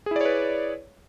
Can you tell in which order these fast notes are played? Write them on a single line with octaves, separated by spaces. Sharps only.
G#4 E4 D5 C#5 B4